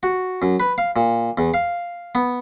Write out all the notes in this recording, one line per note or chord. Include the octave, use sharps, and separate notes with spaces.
F#4
F#2
B4
F5
A#2
E2
F5
B3